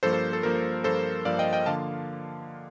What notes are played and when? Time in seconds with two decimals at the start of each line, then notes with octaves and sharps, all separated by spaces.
0.03 G2 F3 A#3 A4 C5
0.13 A4
0.33 A4
0.43 G2 F3 A#3 A#4
0.84 G2 F3 A#3 A4 C5
1.25 G2 F3 A#3 D5 F5
1.39 D#5 G5
1.53 D#5 G5
1.66 D3 F3 A#3 F4 F5 A5